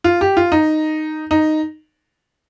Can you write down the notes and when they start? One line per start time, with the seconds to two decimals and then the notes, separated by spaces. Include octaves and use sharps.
0.04 F4
0.21 G4
0.37 F4
0.52 D#4
1.31 D#4